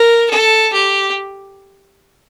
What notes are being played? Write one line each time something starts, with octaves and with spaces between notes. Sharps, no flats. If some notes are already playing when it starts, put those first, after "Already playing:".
Already playing: A#4
A4
G4